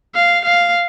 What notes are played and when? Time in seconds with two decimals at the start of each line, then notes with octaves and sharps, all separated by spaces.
0.15 F5
0.45 F5